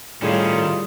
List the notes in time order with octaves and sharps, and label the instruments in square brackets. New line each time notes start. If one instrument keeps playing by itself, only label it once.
[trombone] A2 [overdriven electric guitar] D#3 C#4 [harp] G3 G#4 [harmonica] F4